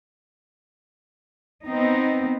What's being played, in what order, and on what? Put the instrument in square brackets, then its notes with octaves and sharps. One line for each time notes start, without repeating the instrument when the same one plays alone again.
[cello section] B3 C4 D#4